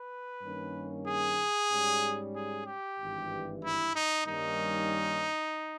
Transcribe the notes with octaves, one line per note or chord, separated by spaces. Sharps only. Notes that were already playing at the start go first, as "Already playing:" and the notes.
Already playing: B4
G2 D#3 A#3 C#4
G#4
G#2 G3 C#4
G#4
G4
G#1 G2 E3
E4
D#4
G2 D#3 G3 A#3 C#4 D#4